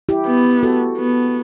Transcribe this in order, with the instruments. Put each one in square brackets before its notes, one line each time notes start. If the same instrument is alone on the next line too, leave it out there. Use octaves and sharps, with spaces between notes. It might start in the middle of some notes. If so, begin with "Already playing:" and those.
[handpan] E4 G4
[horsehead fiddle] B3
[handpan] F#4 A4
[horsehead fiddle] B3